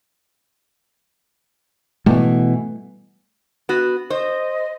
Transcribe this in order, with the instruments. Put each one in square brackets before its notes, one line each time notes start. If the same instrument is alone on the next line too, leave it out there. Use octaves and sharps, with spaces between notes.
[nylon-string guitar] B2 E3 [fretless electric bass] G3 A3
[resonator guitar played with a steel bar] B3 F#4
[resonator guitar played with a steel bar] C5 [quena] D#5